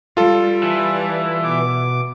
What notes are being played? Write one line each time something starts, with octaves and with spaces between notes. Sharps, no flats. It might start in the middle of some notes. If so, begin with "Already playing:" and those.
G3 F4 A4
E3 A5
B2 B3 D6